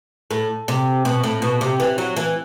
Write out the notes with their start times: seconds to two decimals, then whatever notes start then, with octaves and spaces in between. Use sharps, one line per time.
0.31 A2
0.68 C3
1.05 B2
1.24 A2
1.42 B2
1.61 C3
1.80 E3
1.98 F#3
2.16 E3